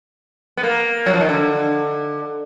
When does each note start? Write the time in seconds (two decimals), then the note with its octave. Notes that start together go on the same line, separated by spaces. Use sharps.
0.57 B3
0.63 A#3
1.06 F#3
1.14 F3
1.21 D#3
1.29 D3